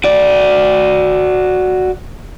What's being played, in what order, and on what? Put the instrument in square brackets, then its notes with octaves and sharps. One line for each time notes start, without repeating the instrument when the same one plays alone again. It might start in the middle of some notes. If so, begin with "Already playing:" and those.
[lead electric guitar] F#4 D5